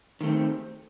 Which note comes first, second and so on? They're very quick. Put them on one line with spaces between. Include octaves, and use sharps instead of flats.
D#3 A3 C4